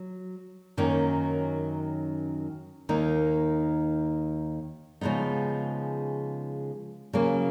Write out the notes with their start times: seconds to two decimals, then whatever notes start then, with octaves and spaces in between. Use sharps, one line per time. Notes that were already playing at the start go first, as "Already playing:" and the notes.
Already playing: F#3
0.77 F#2 D#3 F#3 A#3 C#4
2.89 D#2 D#3 A#3 D#4
5.01 C#3 F3 G#3 B3 D#4
7.13 C#3 F#3 A#3 C#4